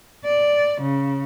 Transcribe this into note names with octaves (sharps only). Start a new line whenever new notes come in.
D5
C#3